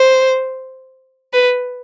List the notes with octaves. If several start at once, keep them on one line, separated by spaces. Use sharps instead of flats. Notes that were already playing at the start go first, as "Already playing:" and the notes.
Already playing: C5
B4